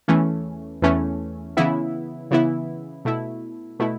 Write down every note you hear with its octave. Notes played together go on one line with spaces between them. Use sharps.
E2 E3 A3 C#4
E2 E3 A3 C#4
C#3 E3 B3 E4
C#3 E3 B3 E4
B2 A3 E4
B2 A3 E4